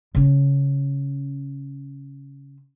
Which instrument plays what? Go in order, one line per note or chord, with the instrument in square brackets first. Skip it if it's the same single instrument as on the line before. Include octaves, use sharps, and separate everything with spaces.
[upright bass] C#3 C#4